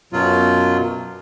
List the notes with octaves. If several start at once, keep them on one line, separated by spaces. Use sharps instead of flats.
F#2 B2 F#3 F4